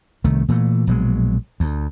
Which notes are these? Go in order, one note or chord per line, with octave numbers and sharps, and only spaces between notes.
C2 D#3 A3
A#2 E3 A3
A#1 B2 F#3 G#3
D2